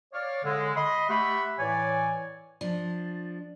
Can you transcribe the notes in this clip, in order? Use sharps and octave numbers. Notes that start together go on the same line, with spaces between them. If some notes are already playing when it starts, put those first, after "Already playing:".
C#5 D5 F5
D3 G#3
D#5 B5 C6
A3 G4 E5 F#5 B5
A2 E3 C#5 D5 G#5
F3 D4